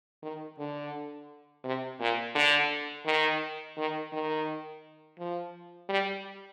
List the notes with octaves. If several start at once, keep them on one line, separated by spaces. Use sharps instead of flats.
D#3
D3
C3
A#2
D3
D#3
D#3
D#3
F3
G3